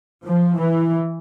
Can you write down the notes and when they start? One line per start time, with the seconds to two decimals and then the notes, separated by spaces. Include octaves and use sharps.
0.24 F3
0.59 E3